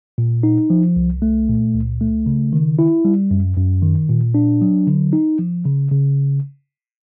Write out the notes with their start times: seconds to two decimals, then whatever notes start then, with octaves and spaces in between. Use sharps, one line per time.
0.18 A#2
0.43 D#4
0.70 F3
0.96 C2
1.22 A3
1.49 A#2
1.75 C#2
2.01 A3
2.26 C#3
2.53 D#3
2.79 E4
3.05 G3
3.31 F#2
3.57 F#2
3.82 D#3
4.09 A#2
4.35 D4
4.62 F#3
4.87 D3
5.13 D#4
5.39 F3
5.65 C#3
5.91 C#3